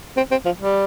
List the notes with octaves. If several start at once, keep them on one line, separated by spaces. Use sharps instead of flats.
C4
C4
F3
G3